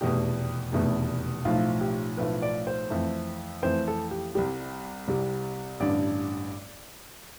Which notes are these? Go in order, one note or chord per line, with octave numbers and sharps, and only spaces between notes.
F1 E2 B2 A3 G4
F1 E2 B2 A3
B1 A2 F3 A3 F4
G4
B1 A2 F3 A3 B4
D5
C5
F2 E3 A3
F2 E3 A3 C5
A4
G4
C2 C3 G3 G4
C2 C3 G3
A1 G2 D3 D5